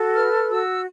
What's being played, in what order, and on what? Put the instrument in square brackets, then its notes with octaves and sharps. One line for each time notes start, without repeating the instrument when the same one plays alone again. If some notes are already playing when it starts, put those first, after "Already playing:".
Already playing: [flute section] F#4 A4
B4 F6
F#4 E6